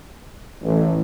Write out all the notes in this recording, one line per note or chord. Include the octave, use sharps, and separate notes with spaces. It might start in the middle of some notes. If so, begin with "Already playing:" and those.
A1